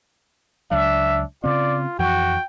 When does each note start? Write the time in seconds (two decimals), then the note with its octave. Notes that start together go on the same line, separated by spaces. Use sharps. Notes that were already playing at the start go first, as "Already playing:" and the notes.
0.71 C#2 F#3 D4 E5
1.44 C#3 C4 F4 D5
1.99 F2 E3 F#4 G5